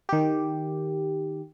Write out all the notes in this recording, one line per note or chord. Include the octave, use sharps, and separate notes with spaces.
D#3 G4